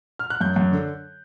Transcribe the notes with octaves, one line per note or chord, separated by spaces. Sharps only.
F6
F#6
F#2 G6
F#2
D3